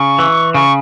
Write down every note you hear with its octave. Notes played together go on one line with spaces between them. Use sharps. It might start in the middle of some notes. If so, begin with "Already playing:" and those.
Already playing: C#3 C#6
E3
C#3 C#6